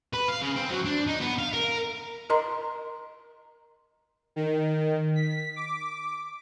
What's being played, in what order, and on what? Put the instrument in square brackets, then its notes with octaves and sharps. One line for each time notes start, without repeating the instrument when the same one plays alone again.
[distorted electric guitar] B4
F5
C#3
C4
F#3
D4
D#4
B3
F5
A#4
[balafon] A#4 D#5 A#5 C6
[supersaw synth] D#3
B6
D6